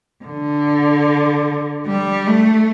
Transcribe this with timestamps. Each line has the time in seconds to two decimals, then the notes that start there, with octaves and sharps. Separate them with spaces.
0.24 D3
1.86 G3
2.27 A3